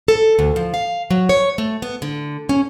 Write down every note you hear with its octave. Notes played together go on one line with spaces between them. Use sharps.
A4
D2
F3
F5
F#3
C#5
A3
B3
D3
C#4